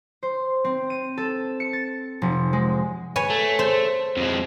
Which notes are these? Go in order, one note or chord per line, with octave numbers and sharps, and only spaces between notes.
C5
C4
D#7
A4
C#7
A6
F1
G#3
B4 C#5 G#5
A3
C5
F2 G#3